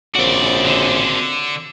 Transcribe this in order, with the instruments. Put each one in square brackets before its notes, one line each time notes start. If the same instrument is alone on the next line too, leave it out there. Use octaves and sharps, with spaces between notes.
[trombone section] A#1 C#3 C5 [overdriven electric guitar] C4 F#4 [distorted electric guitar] D5
[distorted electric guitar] D3